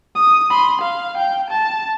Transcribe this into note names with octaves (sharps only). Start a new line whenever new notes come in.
D#6
B5 C6
F5
G5
A5